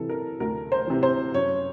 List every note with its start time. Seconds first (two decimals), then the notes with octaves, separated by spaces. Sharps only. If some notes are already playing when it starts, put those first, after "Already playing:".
Already playing: C3 E3 A4
0.09 A#4
0.40 D2 A#4
0.72 C5
0.87 C3 E3
1.03 C5
1.34 F#2 C#5